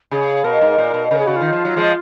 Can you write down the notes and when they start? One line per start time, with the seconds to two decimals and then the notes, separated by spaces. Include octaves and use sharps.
0.11 C#3 G#4
0.44 B2 A#4
0.61 G#2
0.78 A#2
0.94 B2
1.11 C#3 A#4
1.19 G#4
1.27 C#3 F#4
1.36 D#3 F4
1.52 F3
1.65 F#3
1.76 F3 G#3